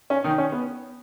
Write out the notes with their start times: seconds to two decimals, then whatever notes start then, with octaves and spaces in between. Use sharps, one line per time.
0.10 C#4
0.24 D#3 D#4
0.38 C#4
0.52 B3